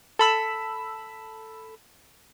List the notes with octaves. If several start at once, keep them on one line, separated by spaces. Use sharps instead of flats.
A4 B5 E6